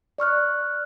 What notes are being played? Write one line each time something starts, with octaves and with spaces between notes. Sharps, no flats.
D5 C#6 F6 F#6